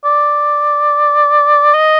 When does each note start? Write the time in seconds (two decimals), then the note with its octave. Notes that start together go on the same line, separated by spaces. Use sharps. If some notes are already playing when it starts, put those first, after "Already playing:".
0.05 D5
1.74 D#5